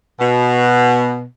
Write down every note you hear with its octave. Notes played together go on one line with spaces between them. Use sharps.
B2